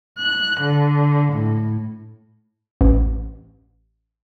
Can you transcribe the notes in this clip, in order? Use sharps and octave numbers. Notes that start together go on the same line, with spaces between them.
F#6
D3
A2
A1